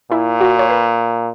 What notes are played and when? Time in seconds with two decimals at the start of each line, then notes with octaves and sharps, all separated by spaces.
0.11 A#2 E4
0.41 F#4
0.59 C#5
0.70 B4